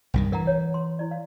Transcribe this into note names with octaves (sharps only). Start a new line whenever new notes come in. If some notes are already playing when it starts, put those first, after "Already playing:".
C2 G2 D#3
E3 A#4 F#5 A#5
C#5
C6
E4 D5
F5